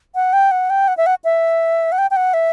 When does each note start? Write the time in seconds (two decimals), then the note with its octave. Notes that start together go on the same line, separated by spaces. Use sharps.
0.15 F#5
0.33 G5
0.51 F#5
0.70 G5
0.88 F#5
0.97 E5
1.06 F#5
1.24 E5
1.92 F#5
1.98 G5
2.11 G5
2.16 F#5
2.34 E5